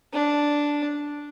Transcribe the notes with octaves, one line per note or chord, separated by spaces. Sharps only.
D4